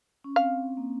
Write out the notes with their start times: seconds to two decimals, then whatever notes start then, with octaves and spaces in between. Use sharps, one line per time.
0.24 C#4
0.36 C4 F5
0.77 A#3